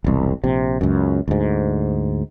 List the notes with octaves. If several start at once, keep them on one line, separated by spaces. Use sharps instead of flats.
E1 C2
A#1 C3
C#2 F#2
D2 G#2